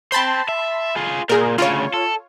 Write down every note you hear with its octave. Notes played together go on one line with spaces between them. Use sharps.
C5 G5 A5 B5 C6
E5
F4 G#4
A#2 G#4 A#4
D2 C#3 F4 C#5
A4